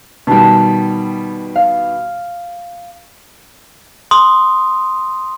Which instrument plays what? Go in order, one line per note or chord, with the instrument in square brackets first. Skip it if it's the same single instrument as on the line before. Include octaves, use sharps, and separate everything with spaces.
[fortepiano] B2 D#3 G3 [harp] G5 A5
[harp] F5
[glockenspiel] C6 D#6